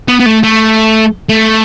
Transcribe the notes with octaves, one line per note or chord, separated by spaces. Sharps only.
B3
B3
A3
A3
A3